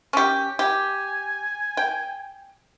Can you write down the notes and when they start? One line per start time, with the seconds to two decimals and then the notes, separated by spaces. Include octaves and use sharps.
0.13 C#4 G4
0.59 G4 G#5
1.77 G5